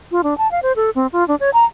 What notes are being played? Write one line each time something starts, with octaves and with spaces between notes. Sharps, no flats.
F4
D4
A5
F5
C5
A4
C4
F4
D4
C#5
A#5